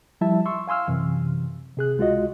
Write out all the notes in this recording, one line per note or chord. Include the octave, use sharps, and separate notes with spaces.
F3 G3 E4 E5 A5
C6 C#6 E6
F5 G#5 C6 E6 F6
F#2 C3 E3
C3 G#4 F#6
C#2 G#3 F4 F#4 D#5